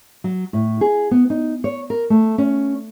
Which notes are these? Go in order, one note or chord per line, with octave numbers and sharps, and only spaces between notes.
F#3
A2
G#4
B3
D#4
C#5
A#4
A3
C#4